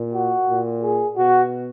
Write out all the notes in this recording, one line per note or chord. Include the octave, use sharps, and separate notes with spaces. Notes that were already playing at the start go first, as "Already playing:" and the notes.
Already playing: A#2
F#4
A#2
G#4
B2 F#4